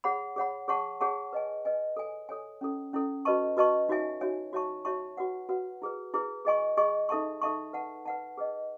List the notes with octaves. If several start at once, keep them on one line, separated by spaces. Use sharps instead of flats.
G#4 C#5 F#5 B5
G#4 C#5 F#5 B5
G#4 C#5 F#5 A5 C#6
G#4 C#5 F#5 A5 C#6
B4 D#5 G#5
B4 D#5 G#5
A4 C#5 G#5
A4 C#5 G#5
C#4 E4 A4
C#4 E4 A4
F#4 B4 D#5 A5 C#6
F#4 B4 D#5 A5 C#6
D#4 F#4 C#5 E5 G#5
D#4 F#4 C#5 E5 G#5
F#4 C#5 E5 A5 C#6
F#4 C#5 E5 A5 C#6
F#4 B4 F#5
F#4 B4 F#5
E4 G#4 B4
E4 G#4 B4
G#4 D#5 G#5 C#6
G#4 D#5 G#5 C#6
D#4 A4 E5 A5 C#6
D#4 A4 E5 A5 C#6
B4 F#5 A5
B4 F#5 A5
G#4 B4 D#5